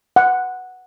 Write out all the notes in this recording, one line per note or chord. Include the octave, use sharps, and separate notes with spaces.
F#5